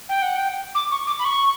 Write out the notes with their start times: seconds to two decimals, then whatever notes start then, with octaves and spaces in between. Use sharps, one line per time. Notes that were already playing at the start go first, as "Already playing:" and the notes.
0.09 G5
0.22 F#5
0.35 G5
0.75 D6
0.91 C#6
1.07 D6
1.19 B5
1.24 C#6